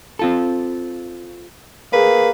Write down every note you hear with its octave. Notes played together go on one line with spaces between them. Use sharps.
C4 F4 A4
A#3 G#4 B4